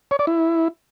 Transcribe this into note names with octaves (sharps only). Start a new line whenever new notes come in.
C#5
D5
E4